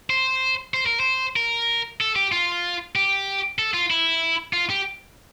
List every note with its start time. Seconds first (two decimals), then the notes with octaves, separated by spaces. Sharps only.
0.10 C5
0.74 C5
0.86 A#4
1.00 C5
1.36 A#4
2.01 A4
2.16 G4
2.32 F4
2.95 G4
3.59 A4
3.74 F4
3.91 E4
4.53 F4
4.70 G4